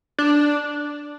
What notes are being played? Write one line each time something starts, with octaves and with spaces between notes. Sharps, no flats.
D4